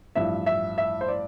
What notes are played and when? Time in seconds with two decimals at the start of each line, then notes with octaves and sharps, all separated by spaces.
0.15 A1 G2 F3 E5
0.46 E5
0.78 E5
1.01 C5
1.08 D5